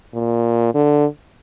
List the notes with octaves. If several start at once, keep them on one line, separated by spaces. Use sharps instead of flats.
A#2
D3